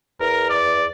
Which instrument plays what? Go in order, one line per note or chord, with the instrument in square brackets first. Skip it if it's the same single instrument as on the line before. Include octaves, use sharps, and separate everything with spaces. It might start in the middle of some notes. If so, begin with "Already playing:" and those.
[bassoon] E2 [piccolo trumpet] A#4
[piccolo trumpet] D5